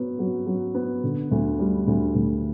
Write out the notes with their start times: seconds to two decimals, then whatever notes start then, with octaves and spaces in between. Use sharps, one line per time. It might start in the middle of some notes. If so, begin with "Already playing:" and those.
Already playing: F#3 B3
0.19 F#3
0.46 F#3
0.74 B3
1.03 D3
1.31 D2
1.59 G3
1.87 D2
2.15 D2